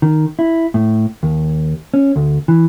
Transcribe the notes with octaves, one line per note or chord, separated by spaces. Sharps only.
D#3
E4
A2
D#2
C#4
D2
E3